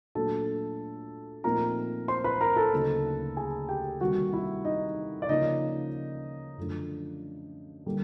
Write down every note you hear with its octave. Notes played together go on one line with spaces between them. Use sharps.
A#2 F#3 A3 D4 A4 A5
A#2 F3 A3 C4 D#4 A#4 A#5
C5 C6
B4 B5
A#4 A#5
A4 A5
D2 C#3 F#3 A#3 D#4
G#4 G#5
G4 G5
C3 D#3 G3 A#3 F#4 F#5
E4 E5
D#4 D#5
D5
C#3 F3 A#3 C#4 D#4 D#5
F#2 D3 F3 A3 D4
D3 G3 A#3